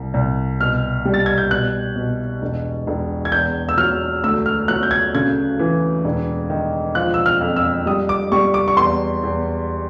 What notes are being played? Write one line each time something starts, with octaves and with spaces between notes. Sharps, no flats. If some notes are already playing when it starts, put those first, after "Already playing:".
Already playing: C2
C2
B2 F6
G3
A6
G#6
G6
B2 F#6
B2
E1
E1
G#6
E2 G6
E6
F#3 F6
D2 E6
F6
F#3 F#6
G6
G#6
C#3 G#6
E3
E1
D#3
F3 F#6
E6
F6
F2
E6
G3 D#6
D6
G3 C#6
D6
C#6
E2 C6
E2